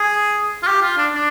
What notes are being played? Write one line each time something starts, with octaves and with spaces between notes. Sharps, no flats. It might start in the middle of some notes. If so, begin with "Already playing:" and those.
Already playing: G#4
F4
G4
F4
D4
D4